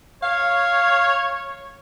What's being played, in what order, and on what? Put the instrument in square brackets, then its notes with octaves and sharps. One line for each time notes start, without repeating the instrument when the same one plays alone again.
[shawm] C#5 [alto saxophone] F5